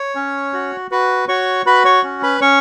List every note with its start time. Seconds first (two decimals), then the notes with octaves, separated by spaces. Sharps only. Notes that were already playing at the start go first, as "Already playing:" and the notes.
Already playing: C#5
0.15 C#4
0.53 F#4
0.91 F#4 B4
1.28 F#4 C#5 C#6
1.66 F#4 B4 B5
1.85 C#5 C#6
2.04 C#4
2.23 B4 B5
2.41 C#4 C#5 C#6